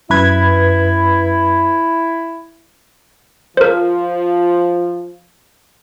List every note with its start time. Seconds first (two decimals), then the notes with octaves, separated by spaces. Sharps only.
0.10 F#2 E4 B4 G#6
3.57 F3 A#4 C5